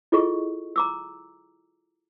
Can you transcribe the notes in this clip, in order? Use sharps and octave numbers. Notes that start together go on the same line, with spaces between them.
E4 F4 G#4 A4 D#5 C#6
A#5 D6 E6